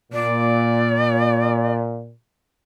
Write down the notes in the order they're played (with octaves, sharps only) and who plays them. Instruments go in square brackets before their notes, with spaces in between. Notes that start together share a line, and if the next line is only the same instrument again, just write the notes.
[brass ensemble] A#2 [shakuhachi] D5